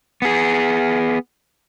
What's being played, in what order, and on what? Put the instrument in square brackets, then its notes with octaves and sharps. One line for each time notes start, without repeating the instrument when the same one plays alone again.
[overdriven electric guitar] B3 G#4